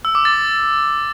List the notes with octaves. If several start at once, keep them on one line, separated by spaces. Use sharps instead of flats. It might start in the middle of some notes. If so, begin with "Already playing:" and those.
E6
D6
A6